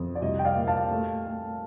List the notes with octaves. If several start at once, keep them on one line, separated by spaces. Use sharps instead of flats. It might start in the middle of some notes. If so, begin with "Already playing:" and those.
Already playing: F2
D5
C2 D#5
G5
D5 F5
A#2
F5 A5
A3
A3